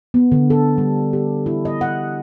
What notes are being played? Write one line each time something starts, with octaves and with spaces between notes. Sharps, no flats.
B3
D3
A4
G3
G4
E4
D#5
F#5